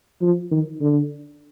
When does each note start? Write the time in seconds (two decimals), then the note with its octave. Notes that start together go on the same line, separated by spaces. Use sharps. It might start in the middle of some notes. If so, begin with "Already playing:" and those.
0.22 F3
0.51 D#3
0.81 D3